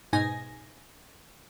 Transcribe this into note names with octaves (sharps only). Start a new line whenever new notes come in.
G#2 B2 D#4 G#5 A#6